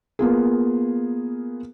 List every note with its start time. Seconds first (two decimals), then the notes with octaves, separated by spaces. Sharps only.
0.19 A#3 B3 F4 G#4